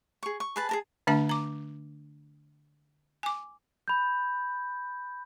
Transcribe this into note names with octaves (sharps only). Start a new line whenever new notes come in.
G#4 C#6
C#6
G#4 B4 A5
G#4 A#4 A5
D3 A3 D4 E5 A5
A#5 D6
G#5 D6
B5 G6